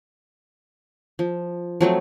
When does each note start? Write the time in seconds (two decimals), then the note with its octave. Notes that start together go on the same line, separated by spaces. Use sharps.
1.19 F3
1.81 F3 F#3 A3 C4